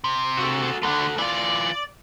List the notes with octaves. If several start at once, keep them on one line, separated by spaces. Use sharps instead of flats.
C3
F#4 A4
D2 D3 A3 F#5
E3 F4 D5